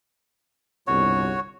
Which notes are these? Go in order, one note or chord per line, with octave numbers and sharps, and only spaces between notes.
G1 C2 B2 F#4 C#5